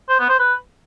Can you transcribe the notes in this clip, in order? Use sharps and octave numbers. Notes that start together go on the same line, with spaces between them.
C5
B3
C5
B4